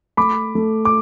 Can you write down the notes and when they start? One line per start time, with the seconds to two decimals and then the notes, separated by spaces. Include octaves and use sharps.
0.17 A3 B5 D6
0.55 A3
0.85 D6